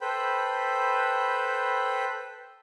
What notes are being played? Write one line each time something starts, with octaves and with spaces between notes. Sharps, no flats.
A4 B4 C5 G5 B5